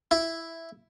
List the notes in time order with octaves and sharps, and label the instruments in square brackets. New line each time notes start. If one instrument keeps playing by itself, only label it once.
[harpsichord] E4